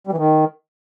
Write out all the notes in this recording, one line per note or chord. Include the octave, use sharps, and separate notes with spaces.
G3
E3
D#3